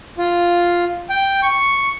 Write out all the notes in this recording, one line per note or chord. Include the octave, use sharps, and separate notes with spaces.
F4
G5
C#6